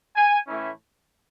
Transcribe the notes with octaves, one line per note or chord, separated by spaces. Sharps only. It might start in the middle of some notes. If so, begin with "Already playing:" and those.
G#5
A2 E3 A3 C#4 E4